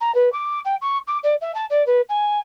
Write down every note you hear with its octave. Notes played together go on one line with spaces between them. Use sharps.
A#5
B4
D6
G5
C#6
D6
D5
E5
A5
D5
B4
G#5